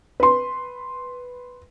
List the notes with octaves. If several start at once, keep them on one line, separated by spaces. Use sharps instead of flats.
B4 C6